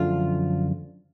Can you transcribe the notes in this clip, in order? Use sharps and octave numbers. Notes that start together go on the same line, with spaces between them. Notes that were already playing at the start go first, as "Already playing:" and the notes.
Already playing: F#2 D3 F3 A3 D4 F4